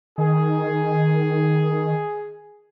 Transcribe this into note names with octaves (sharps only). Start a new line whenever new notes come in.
D#3 G#4